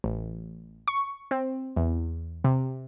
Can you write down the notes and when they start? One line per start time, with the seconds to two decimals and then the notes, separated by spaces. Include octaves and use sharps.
0.04 A1
0.88 C#6
1.31 C4
1.76 E2
2.44 C3